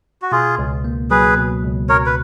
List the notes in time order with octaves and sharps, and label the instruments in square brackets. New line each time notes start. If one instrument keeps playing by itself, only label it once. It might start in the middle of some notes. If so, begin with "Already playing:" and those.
[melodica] F#4
[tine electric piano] B2 [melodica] F4 G#4
[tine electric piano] C#2
A#3
[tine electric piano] F#3 [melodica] G#4 B4
[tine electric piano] B2
C#2
[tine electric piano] B2 [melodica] A#4 C#5
[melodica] B4